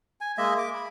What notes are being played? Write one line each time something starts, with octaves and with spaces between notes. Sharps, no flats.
G#5
G#3 A#3 D#5 E5
D6
B5